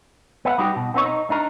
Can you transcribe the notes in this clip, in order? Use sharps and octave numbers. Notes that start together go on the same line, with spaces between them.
B3 E5 F#5
G3 D#4 F#4 G4
B2
B3 C4 D#4 C#5
D#4
D4 D#4 A#4